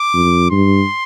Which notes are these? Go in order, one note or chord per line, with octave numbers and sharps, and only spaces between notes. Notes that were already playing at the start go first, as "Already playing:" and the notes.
Already playing: D6
F2
G2 C6